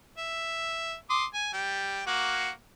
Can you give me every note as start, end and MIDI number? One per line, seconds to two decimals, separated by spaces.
0.18 0.95 76
1.10 1.25 84
1.10 1.25 86
1.10 1.25 87
1.34 1.51 80
1.53 2.02 55
1.53 2.02 79
2.07 2.50 58
2.07 2.50 66
2.07 2.50 78